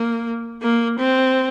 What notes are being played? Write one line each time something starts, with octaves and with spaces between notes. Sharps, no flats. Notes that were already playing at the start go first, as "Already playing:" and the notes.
Already playing: A#3
A#3
C4